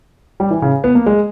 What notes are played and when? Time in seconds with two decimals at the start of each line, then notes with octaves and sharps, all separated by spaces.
0.40 G3
0.51 E3
0.62 C#3
0.84 B3
0.95 A#3
1.06 G#3